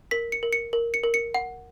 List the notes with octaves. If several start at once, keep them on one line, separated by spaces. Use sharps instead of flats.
A#4 B6
C#7
A#4
C#7
A#4
C#7
A#4
C#7
F#5